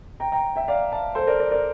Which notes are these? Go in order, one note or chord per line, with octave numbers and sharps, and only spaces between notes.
G5 A#5
G5 A#5
E5 G5
D5 F5
F5 A5
A4 C5
A#4 D5
A#4 D5
A#4 D5